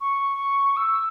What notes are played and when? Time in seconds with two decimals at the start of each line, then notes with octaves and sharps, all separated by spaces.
0.01 C#6
0.77 E6